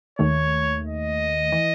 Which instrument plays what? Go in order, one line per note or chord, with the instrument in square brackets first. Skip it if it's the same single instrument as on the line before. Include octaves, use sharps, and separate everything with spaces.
[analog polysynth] D#2 D#3 A3 [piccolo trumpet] C#5
[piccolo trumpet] D#5
[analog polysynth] E3